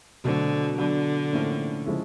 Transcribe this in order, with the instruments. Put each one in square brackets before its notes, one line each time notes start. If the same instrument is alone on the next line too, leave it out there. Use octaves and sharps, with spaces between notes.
[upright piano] B2 F#3 A3 C4 [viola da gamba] D3
[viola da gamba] D3 [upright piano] F#3 B3 D4
[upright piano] A2 F3 A#3 C#4 E4
C#3 F3 G#3 C#4 E4